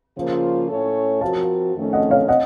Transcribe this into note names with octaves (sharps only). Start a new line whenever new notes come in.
C#3 F3 A#3 F4 C5
A2 A3 C#4 A4 C#5
F3 C4 F#4 A#4 F5 A5
F2 D#3 A3 C#4 A4
D#5 F#5
C#5 F5
D#5 F#5